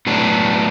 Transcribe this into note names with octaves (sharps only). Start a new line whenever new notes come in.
A2 F#3 B3 D4